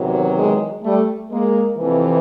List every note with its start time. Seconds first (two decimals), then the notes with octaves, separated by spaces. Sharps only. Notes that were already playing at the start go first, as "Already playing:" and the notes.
Already playing: E2 C3 D#3 F#3
0.34 G#3
0.82 G3 A3
1.30 G#3 A#3
1.77 F2 C3 E3